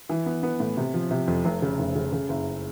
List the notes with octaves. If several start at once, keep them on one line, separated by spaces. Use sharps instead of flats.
E3
B3
B3
A2
C3
F3
C3
F2
F1
C#3
F1
C#3
C#3
F#1